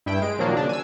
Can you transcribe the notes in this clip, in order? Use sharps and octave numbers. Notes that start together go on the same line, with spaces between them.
G2 E4 G5
G#3 D7
A#2 D#3 F3 F#3 A#3 D4
C#3 D4
G#5 E6